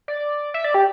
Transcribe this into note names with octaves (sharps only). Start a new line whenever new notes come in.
D5
E5
D5
G4